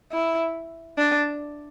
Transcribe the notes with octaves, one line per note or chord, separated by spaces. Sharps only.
E4
D4